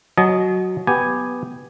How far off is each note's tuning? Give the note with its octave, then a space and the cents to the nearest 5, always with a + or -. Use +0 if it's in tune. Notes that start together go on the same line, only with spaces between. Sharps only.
F#3 +0 D#5 +0 A5 -45
B3 +0 G4 +0 G#5 +0